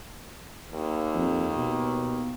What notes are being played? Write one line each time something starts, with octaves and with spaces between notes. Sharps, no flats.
D#2
F2
B2